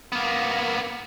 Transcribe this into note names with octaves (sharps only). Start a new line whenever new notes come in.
A#3 B3